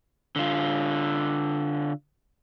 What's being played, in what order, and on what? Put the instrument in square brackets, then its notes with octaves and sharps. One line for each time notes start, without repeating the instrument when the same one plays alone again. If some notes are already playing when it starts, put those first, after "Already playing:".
[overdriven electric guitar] D3 F4